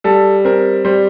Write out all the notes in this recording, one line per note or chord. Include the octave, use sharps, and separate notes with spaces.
G3 A4
C4 A#4
G3 C5